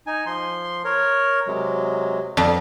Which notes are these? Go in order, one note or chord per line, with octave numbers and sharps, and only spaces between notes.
D#4 G#5
F3 C6
A#4 C#5
C3 F#3 G#3
F2 B3